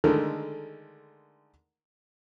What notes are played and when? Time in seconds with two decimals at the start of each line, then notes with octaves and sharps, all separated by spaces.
0.04 D3 D#3 G#3 A3 A#4